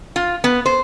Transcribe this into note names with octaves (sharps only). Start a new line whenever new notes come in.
F4
B3
C5